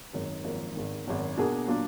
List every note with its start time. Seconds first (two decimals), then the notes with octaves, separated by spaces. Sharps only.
0.13 G#1 F#2 D#3 G#3
0.44 G#1 F#2 F3 A#3
0.76 G#1 G#2 D#3
1.06 G#1 F#2 D#3
1.37 B2 A#3 D4 G#4
1.68 A#2 F#3 D4 F4